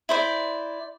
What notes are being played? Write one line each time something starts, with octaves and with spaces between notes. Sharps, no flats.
E4 C5 D5